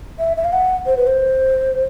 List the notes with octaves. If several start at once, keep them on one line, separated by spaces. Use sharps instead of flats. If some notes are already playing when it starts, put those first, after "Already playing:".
E5
E5
F5
F#5
C5
B4
C5